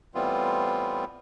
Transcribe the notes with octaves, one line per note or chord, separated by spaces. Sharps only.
A2 E3 G3 B3 C4 F4